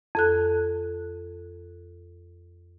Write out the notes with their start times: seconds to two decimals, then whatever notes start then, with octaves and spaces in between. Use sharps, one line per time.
0.15 F2 A4 F#6